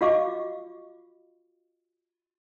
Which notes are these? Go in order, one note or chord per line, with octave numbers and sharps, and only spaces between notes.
F4 F#4 D#5 F5 C#6 D6